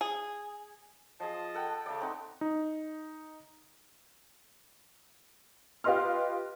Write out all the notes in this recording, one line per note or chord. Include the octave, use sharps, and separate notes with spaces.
G#4
F3 F4 G#4 D#5 A5
A4 F#5 G5
C#3 A3 D5
C4 D#4 F#5
D#4
F4 G4 B4 D#5 C6 F6